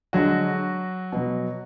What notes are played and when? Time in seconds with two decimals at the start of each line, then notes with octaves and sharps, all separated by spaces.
0.13 D3 F#3 G#3 F#4
1.12 B2 F#3